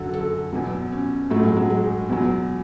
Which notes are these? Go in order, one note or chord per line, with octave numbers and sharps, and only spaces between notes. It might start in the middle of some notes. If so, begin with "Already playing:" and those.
Already playing: F#2 D3 F#3 F#4 A4
A4
E2 B2 F#3
C#4
A2 F#3 A3
G#3
F#3
G#3
E2 B2 F#3